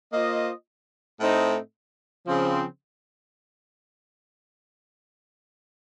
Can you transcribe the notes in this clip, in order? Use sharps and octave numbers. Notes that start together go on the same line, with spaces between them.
A#3 F4 C5 D#5
A2 A3 C4 D#4
C#3 F3 C4